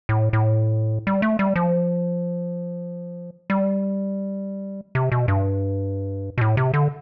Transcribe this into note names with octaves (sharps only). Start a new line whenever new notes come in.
A2
A2
G3
A3
G3
F3
G3
C3
B2
G2
B2
A2
C3
D3